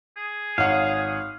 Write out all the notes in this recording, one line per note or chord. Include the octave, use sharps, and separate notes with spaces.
G#4
G#1 C#5 F5 F#5